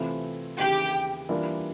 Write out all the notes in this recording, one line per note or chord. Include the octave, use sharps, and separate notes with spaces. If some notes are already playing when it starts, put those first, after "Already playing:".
Already playing: C3 E3 A3 C4 F4
D#2 C#3 E3 G4
E3 G3 A#3 D4 F4